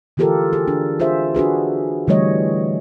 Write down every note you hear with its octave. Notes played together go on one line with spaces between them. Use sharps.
D3 E3 F4 G4 A4 A#4
G#4
D4
F4 G#4 C5 E5
D4 F#4 G#4 B4
D3 E3 G3 A3 C#5 D#5